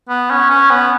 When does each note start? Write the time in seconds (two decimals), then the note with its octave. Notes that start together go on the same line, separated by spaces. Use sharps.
0.09 B3
0.30 C#4
0.50 C#4
0.71 B3